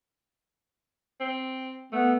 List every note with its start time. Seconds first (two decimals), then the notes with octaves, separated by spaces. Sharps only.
1.20 C4
1.92 A3 B3